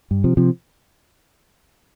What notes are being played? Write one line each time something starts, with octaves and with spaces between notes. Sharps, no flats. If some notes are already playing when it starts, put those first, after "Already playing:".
G2
C3 F3
C3 F3